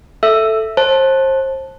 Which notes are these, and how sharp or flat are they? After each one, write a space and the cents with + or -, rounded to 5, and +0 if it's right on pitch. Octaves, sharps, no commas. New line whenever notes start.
A4 +0 E5 +0 E6 +10
C5 +30 A5 +0